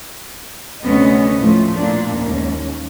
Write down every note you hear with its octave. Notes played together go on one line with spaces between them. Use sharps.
D2 C3 B3 C#4 D#5
A2 F3 A3 F4
A#2 A#3 D4
D#2 C#4